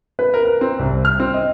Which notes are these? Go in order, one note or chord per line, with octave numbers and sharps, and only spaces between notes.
B4
A#4
A#4
C4
C2
F6
C4
D#5